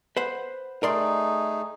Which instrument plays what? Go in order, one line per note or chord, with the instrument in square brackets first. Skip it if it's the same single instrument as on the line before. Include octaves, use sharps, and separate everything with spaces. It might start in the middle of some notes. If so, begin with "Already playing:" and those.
[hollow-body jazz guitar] B4 C5 F#5
[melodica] A3 D#4 G#4 [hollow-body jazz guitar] A#4 D5 C6